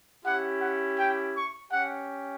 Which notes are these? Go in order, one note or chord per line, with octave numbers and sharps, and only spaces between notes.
C#4 E4 G4 F#5
F#5
G5
C#6
C#4 G4 F#5